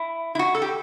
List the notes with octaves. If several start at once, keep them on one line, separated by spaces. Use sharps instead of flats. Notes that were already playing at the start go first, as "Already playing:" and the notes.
Already playing: E4
E4
F#4
A4
G4